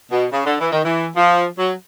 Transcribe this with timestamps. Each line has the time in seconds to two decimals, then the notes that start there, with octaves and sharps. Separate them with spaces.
0.11 B2
0.33 C#3
0.46 D3
0.61 E3
0.72 D#3
0.85 E3
1.16 F3
1.59 F#3